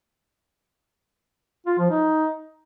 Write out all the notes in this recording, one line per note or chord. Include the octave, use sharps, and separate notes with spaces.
F4
F3
D#4